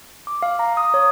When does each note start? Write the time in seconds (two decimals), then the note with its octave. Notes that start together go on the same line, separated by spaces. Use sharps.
0.27 D6
0.42 F5
0.59 A#5
0.77 D#6
0.94 C#5